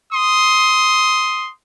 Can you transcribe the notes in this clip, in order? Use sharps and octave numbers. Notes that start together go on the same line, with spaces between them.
C6 D#6